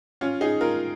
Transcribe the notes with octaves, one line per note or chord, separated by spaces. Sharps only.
C#4 F4
D#4 G#4
F4 A#4